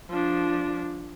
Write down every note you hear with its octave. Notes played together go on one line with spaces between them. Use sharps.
F3 D4